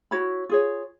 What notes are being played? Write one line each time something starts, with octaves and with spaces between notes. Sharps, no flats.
E4 F#4 C#5 B5
F4 G#4 C#5